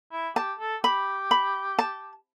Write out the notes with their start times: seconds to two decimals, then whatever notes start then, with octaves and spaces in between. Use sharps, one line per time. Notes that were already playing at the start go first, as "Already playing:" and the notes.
0.12 E4
0.36 G4 A5
0.59 A4
0.83 G4 B5
1.31 B5
1.79 A5